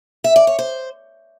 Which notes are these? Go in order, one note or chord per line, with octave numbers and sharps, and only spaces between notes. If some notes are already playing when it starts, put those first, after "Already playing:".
E5
D5
C#5
C5